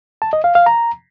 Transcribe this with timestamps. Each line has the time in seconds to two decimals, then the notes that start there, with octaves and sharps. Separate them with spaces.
0.22 A5
0.33 D#5
0.44 F5
0.55 F5
0.66 A#5